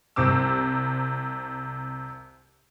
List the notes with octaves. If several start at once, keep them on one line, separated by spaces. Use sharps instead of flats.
C2 C3 C4 D6 E6